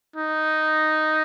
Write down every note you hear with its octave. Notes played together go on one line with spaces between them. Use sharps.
D#4